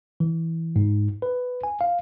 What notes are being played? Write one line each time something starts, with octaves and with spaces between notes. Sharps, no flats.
E3
G#2
B4
G#5
F5